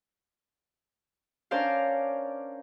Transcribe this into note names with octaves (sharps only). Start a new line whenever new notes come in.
C#4 D4 A#4 C5 D5 F5